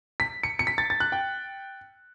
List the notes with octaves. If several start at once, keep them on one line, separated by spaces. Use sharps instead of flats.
B6
C#7
C#7
B6
A6
A6
F#6
G5